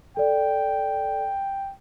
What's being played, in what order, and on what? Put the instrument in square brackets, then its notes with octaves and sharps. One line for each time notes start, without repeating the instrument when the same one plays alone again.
[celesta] A4 D5 [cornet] G5